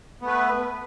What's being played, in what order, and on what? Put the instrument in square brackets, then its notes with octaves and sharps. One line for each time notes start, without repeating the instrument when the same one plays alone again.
[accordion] B3
A3
B4